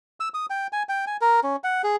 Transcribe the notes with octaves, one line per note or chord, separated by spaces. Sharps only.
E6
D#6
G5
G#5
G5
G#5
A#4
C#4
F#5
G#4